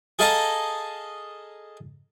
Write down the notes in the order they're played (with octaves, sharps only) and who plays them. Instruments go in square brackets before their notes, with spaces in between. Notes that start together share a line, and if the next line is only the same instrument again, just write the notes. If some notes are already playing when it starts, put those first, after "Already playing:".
[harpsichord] G#4 A4 D#5 F5 A5 A#5